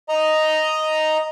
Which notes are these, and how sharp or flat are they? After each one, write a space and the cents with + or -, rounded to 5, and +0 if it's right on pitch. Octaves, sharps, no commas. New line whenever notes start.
D#5 +0 A#5 +0